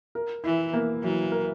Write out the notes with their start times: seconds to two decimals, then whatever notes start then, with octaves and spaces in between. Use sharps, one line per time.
0.15 A#4
0.44 E3 E4
0.73 A#3
1.03 E3 F#3
1.32 A#4